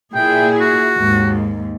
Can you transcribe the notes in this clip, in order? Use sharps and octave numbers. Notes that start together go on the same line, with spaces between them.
A#2 E4 G#4 G5
F#4
D#2 G#2